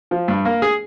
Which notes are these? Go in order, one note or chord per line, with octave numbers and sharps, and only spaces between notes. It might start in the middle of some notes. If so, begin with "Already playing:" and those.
F3
G2
A#3
G#4